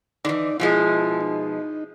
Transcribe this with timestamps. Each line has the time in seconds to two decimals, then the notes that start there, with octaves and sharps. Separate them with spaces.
0.25 D3 E3 D#4 D5
0.60 B2 F3 G#3 E4
1.21 D#4